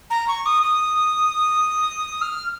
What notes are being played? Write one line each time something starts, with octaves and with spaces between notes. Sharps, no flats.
A#5
C#6
D#6
D#6
F6